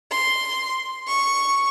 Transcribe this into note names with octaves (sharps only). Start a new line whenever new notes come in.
C6
C#6